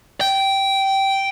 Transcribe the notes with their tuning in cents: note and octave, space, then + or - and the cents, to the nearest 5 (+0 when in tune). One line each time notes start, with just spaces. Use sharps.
G5 -10